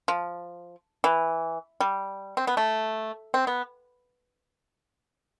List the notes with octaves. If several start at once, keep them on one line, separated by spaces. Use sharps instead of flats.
F3
E3
G3
C4
B3
A3
C4
B3